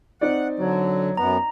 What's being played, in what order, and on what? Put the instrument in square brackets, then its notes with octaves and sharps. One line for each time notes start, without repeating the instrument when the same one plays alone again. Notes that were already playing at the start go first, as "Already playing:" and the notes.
[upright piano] C4 D#4 D5 [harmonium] F#5
[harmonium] D3 [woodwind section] F#3
[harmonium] F#2 B3 [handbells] A#5